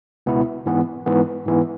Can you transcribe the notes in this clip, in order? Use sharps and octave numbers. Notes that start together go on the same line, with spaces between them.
C#2 B2 B3 E4
G#2 E3 B3
G#2 E3 B3
G#2 E3 B3